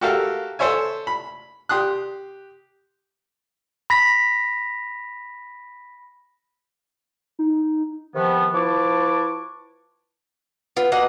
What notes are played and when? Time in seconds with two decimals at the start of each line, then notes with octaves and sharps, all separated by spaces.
0.01 F#4 G4 A4 A#4 E5 F5
0.59 A4 C5 C#5 E5 G#5
1.07 B5
1.69 G4 C6 D#6 F#6
3.90 B5 A#6 B6
7.39 D#4
8.15 C3 D#3 F3 B3
8.54 F3 E4 B4 A5 C#6 D6
10.77 B3 F4
10.92 B2 A#3 D#5 F#5